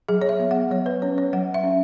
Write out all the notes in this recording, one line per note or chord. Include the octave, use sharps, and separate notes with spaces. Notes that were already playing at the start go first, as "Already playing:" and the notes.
F#3 G#4
C#5
E5
B3
F#5
F#3 C#5
B4
C#4 C#5
C#5
F#3 F#5
E5
C#4